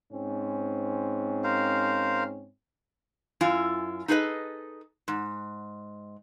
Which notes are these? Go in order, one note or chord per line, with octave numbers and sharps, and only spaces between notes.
G#2 C4 C#4
A#4 C5 F5
F#2 E4 F4 G#5
D#4 G#4 A4 B4 D#5
G#2